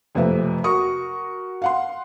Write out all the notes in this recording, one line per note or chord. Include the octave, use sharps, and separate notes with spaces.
F#1 F2 C3 A3 B4 E5
F#4 A#4 C#6 D#6
F5 F#5 C6